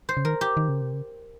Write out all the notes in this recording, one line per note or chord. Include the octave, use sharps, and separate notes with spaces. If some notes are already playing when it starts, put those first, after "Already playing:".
C5
C#3
D#3 A#4
G4
D#3
C#3
C3
C#3